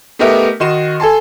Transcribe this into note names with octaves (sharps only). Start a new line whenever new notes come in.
A3 B3 D#4 G4 A#4 E5
D#3 F#4 D#5 C6 E7
A4 G#5 A5 C6